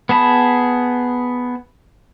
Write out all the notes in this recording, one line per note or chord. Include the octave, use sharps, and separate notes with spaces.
B3 G#4 A5 B5